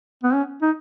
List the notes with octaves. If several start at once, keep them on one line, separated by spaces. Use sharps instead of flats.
B3
C#4
D#4